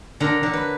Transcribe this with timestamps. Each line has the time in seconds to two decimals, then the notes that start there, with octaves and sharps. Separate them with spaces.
0.20 D3 A#4
0.43 D3
0.53 B4